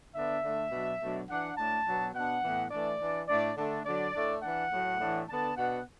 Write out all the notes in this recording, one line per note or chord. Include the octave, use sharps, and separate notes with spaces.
D3 B3 D4 E5
D3 A3 D4
B2 F#3 D4
B2 F#3 A3 D4
E3 D4 F#5
A2 A3 D4 A5
B2 F#3 B3 D4
B2 B3 D4 F#5
A2 E3 B3
E3 A3 D4 D5
E3 D4
A2 A3 D4 D5
D3 A3 D4
D3 F#3 D4 D5
A2 A3 D4
E3 D4 F#5
A2 F#3 A3
A2 E3 A3 D4
D3 B3 D4 A5
B2 B3 D4 F#5